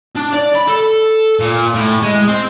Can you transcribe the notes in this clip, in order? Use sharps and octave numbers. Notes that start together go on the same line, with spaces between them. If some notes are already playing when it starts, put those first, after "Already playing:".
D4
D5
B5
A4
A#2
A2
G#3
C4